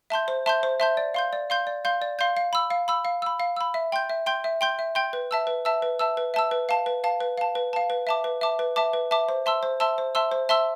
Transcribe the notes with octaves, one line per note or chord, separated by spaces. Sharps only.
E5 A5 C6 G6
C5
E5 A5 C6 G6
C5
E5 A5 C6 G6
D5
F5 C6 G6
D5
F5 C6 G6
D5
F5 C6 G6
D5
F5 C6 G6
F5
B5 E6
F5
B5 E6
F5
B5 E6
F5
B5 E6
E5
G5 C6 G6
E5
G5 C6 G6
E5
G5 C6 G6
E5
G5 C6 G6
B4
E5 A5 E6
B4
E5 A5 E6
B4
E5 A5 E6
B4
E5 A5 E6
B4
F5 A5
B4
F5 A5
B4
F5 A5
B4
F5 A5
B4
E5 A5 D6
B4
E5 A5 D6
B4
E5 A5 D6
B4
E5 A5 D6
C5
E5 A5 C6 E6
C5
E5 A5 C6 E6
C5
E5 A5 C6 E6
C5
E5 A5 C6 E6